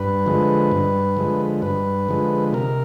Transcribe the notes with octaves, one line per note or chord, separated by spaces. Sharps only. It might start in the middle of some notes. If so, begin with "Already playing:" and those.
Already playing: G2 B4
D3 F3 G#3
G2
D3 F3 G#3
G2 B4
D3 F3 G#3
C3 A#4